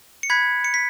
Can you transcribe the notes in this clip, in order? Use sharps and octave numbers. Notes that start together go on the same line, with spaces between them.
C#7
B5 F#6 G#6 B6
C#7
B6